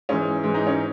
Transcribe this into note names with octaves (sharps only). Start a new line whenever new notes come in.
G#2 E3 C#4
G#2 E3
D#4
C#4